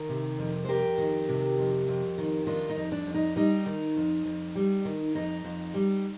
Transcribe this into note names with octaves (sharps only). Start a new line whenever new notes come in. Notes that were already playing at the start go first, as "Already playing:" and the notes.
Already playing: D#3 A#4
C3
F2
C5
F2 G4 A#4
D#3
C3
F2
F2
D#3
D#3 D4 F4
D#4
F2
D4
F2
D#4
G3 D#4
D#3
F2
F2
G3
D#3
F2 D#4
F2
G3